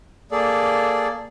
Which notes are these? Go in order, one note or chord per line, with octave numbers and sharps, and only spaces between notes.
A#3 G#4 A4 D5